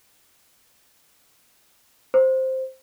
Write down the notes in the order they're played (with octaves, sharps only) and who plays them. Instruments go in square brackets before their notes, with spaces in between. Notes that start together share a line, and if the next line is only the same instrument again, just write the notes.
[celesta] C5